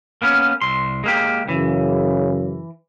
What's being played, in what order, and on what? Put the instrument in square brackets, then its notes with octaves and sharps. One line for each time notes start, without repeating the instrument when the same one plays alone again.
[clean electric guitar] A#3 B3 C#4
C2 C6
G#3 A#3 G4
[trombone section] F#2 C#3 [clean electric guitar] E3